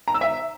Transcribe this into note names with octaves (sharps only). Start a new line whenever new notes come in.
A#5
E6
E5